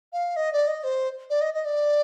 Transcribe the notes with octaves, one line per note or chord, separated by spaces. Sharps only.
F5
D#5
D5
D#5
C5
D5
D#5
D#5
D5